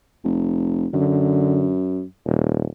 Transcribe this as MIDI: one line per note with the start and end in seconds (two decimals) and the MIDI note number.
0.24 0.87 29
0.94 2.03 42
0.94 1.74 50
2.26 2.65 27